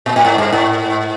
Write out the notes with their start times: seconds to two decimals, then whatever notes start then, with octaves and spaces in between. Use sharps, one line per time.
0.06 A#2
0.16 A2
0.25 G#2
0.38 G2
0.52 G#2